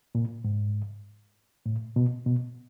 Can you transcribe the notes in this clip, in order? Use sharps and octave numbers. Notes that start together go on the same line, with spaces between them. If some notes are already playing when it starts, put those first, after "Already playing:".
A#2
G#2
A2
B2
B2